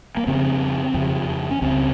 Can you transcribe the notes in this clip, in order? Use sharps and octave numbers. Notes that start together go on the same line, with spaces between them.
A#3
F2 C#3 C4
F2 C#3
C#4
C#2 C#3 C4